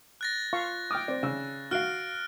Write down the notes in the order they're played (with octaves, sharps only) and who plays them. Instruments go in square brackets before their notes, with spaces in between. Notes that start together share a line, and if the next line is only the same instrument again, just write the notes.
[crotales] F#6 A6 A#6
[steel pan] F4 F5 C#6
[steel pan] G5 D6 [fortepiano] D#6 F6
[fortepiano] C4 [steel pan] D5
[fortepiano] C#3 E6
[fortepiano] F#4 F5 [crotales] F6 F#6 D7